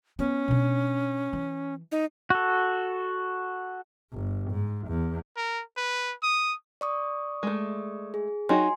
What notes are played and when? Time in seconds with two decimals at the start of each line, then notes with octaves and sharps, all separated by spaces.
0.19 B3 C#4
0.48 B2 D4
1.33 E3
1.92 D#4
2.30 F#4 A4
4.13 G1
4.52 G#2
4.89 E2
5.37 A#4
5.77 B4
6.23 D#6
6.81 D5 C#6 D#6
7.43 G#3 A3
8.14 G#4
8.49 F#3 D#4 F#4 G#5 C6